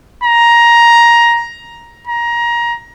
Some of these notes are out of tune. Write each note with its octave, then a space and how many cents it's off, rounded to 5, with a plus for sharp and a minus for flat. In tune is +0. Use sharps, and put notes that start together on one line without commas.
A#5 +15
A#5 +20